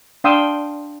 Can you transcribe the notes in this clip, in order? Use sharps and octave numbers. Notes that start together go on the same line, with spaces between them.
D4 F5 G5 C6 D#6 E6